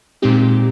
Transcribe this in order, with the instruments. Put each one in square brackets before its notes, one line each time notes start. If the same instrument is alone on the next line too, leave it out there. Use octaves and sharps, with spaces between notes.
[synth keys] A#2 G#3 C4 D#4 G4